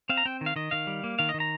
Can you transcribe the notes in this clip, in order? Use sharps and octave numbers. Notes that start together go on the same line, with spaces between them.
C4 F5
A#5
C4 G5
D#3
F5
D#3 D#5
D#3 F5
G3
A#3
D#3 F5
D#5
D#3
A#5